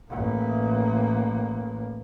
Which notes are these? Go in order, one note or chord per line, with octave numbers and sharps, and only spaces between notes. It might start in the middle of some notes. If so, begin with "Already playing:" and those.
A1 A#3